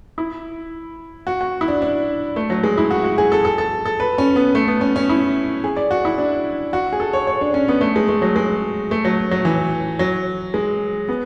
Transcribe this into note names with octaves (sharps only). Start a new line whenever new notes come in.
E4
F#4
F#4
E4
D4
D4
A3
F#3
G#3
E4
F#4
F#4
G#4
A4
A4
A4
A4
B4
C#4
B3
A3
B3
C#4
C#4
E4
G#4
D5
F#4
E4
D4
F#4
G#4
A4
C#5
C#5
D4
C#4
B3
A3
G#3
A3
F#3
G#3
A3
F#3
F#3
E3
F#3
G#3
B3